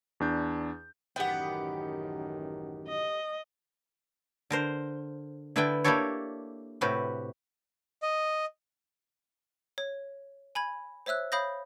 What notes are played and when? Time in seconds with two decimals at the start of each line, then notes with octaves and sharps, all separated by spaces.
0.20 E2 D4 G6
1.16 A1 F#2 D#3 B3 G4 F#5 G5
2.88 D#5
4.50 D3 A#4 C5
5.56 D3 E4 B4 D5 E5 G5
5.84 A#3 D4 E4 G4 A4 C#5
6.81 A2 C3 F#4 G4 B4
8.03 D#5
9.78 C#5
10.55 G#5 B5 G#6
11.06 C5 C#5 E5 E6 F#6
11.32 C#5 F5 B5 D#6 G6 A#6